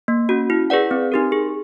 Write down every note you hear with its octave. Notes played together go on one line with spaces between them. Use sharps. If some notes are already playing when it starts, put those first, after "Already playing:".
A#3
C#4 F#4
E4
G#4 B4 D5 F#5
C4
D#4 G4 A#4
G#4